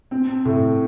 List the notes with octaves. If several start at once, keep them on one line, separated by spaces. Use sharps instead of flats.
C4
A2